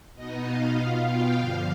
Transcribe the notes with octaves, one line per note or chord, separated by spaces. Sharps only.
B2 B3 D#4 D#5
F5
B2 B3 F4
G5
G2 D3 F3 F5